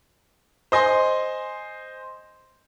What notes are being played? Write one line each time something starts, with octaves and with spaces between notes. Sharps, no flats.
C5 D#5 G#5 C6